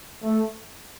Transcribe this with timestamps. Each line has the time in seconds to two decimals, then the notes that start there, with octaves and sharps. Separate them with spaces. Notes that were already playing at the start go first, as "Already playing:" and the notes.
0.22 A3